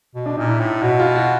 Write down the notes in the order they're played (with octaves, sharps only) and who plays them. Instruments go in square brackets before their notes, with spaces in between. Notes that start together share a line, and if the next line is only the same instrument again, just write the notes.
[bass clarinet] B2
[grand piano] D4
[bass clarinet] A#2 [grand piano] D#4
[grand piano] E4
[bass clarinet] A2
[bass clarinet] B2 [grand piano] F#4
[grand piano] F4
F#4